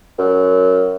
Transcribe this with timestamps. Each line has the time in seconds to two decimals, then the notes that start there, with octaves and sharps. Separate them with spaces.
0.18 F#2